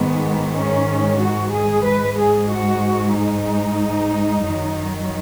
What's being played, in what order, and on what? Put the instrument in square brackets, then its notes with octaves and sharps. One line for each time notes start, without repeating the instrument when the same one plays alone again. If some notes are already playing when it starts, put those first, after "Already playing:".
Already playing: [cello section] G#2 D#3 G#3 B3
C#4
F#4
G#4
G#2 G#3 B4
G#4
F#4
D#4
F#2 D#3 F#3